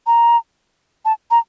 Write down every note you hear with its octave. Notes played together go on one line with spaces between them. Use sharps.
A#5
A5
A#5